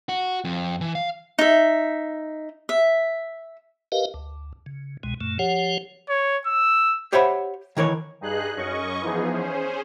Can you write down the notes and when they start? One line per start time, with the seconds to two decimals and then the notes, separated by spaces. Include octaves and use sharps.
0.09 F#4
0.44 F2
0.81 E3
0.95 F5
1.39 D#4 E5
2.69 E5
3.92 G4 A#4 B4 D#5 F5
4.14 D2
4.66 C#3
5.03 C2 B2 G#3
5.21 F#2 A#2 A3
5.39 F3 G4 C#5 F#5
6.09 C#5
6.47 E6
7.13 G4 C5 C#5 E5 F#5 B5
7.77 D#3 E3 A#4 C#5
8.21 G2 D#4 G#4 F#6
8.57 F#2 C#4 D#5 C#6
9.02 E3 F3 B3 D#4 G#4
9.32 C#4 G#4 C5